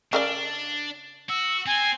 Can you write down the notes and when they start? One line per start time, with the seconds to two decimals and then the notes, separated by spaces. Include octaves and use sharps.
0.13 C#3 D4 A#4 D5
1.29 F#4 E6
1.66 C4 G#5